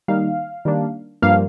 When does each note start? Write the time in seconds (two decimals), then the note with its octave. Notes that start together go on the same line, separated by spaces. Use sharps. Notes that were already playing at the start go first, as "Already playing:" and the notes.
0.08 D#3 G3 A#3 D#4 F5
0.65 D#3 G3 A#3 D4
1.22 G2 F3 A#3 F5